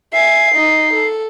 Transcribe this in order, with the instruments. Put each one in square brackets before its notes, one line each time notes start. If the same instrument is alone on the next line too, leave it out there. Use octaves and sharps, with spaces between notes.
[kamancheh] E5 G#5 [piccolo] C7
[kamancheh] D#4 D#5
A4